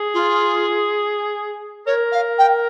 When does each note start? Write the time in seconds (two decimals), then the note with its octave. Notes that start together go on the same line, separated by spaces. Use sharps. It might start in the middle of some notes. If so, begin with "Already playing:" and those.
Already playing: G#4
0.13 F4
1.86 A#4 C#5
2.12 F5
2.38 G5